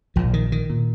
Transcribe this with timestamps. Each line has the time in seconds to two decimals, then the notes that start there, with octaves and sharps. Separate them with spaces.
0.16 A#1 A#2 F3
0.33 D#3
0.52 D#3
0.70 A#2